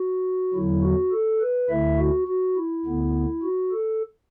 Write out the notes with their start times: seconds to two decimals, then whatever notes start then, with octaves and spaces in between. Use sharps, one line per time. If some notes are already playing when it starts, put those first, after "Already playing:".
Already playing: F#4
0.54 E2 D3 F#3 E4
0.83 F#4
1.12 A4
1.41 B4
1.69 D2 D3 A3 E4 E5
1.98 F#4
2.28 F#4
2.56 E4
2.85 D2 D3 B3
3.43 F#4
3.72 A4